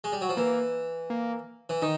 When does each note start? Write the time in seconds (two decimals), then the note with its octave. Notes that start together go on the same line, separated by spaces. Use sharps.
0.04 G#3
0.12 G3
0.21 F#3
0.29 F3
0.37 E3 A#3
1.10 A#3
1.69 E3
1.82 D#3 D#4